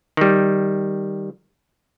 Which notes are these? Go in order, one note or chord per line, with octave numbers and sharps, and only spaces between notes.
D#3 G3